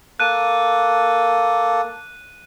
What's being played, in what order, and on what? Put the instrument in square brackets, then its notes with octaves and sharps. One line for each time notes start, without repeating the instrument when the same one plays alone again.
[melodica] A#3 A4 [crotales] F#6 D#7